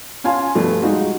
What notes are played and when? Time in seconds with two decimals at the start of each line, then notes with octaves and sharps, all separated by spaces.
0.24 C#4 F4 F5 G#5 A5 C6
0.55 G2 B2 F3 A3
0.82 G3 G#3 D#4 F4 F#4